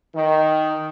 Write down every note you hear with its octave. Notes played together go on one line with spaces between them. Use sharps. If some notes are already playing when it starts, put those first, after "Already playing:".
D#3